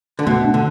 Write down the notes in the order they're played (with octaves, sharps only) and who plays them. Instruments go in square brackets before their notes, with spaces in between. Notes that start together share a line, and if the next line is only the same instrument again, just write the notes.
[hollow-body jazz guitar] D3
[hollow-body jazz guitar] B2 [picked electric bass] A3
[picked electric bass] D4
[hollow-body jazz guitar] D3